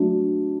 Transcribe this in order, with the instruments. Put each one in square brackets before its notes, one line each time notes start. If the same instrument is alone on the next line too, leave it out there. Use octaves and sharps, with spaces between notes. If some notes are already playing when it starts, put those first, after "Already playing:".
Already playing: [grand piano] F#3 A3 D4